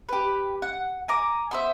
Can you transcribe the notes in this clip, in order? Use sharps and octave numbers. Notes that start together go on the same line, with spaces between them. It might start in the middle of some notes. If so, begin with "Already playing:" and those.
G4 B4
F#5
G#5 A#5 D6
B3 C5 E5